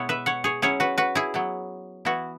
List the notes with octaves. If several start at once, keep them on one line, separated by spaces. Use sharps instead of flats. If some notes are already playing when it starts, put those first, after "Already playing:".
Already playing: B2 G#3 B3 E4 C#5 F#5
B4 E5
C#5 F#5
G#4 C#5
F#3 C#4 E4 G#4 C#5
F#4 B4
F#4 B4
E4 G#4
F#3 B3 E4
E3 B3 E4 F#4